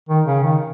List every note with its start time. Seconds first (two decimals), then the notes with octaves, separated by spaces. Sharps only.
0.09 D#3
0.26 C#3
0.43 D#3